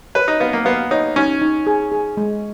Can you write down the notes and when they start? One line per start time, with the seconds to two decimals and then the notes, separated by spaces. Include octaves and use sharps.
0.15 B4 C#5
0.28 D#4
0.40 B3 F5
0.53 A#3
0.65 B3 F5
0.91 D#4 C#5
1.16 C#4 D#4
1.42 D#4
1.67 G#4
1.92 G#4
2.17 G#3